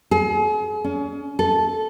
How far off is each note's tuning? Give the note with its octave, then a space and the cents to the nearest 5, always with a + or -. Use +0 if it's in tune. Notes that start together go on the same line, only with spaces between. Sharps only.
G#4 +40
C#4 +30
A4 -10